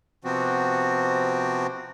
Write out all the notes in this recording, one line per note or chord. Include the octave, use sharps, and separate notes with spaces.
C3 F3 B3 C4 F#4